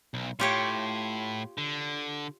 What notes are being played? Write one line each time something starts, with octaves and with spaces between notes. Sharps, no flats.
B1
A2 F4 G4 C#5
D3